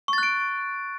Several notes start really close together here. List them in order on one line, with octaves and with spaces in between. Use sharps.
C#6 A6 F#6 D7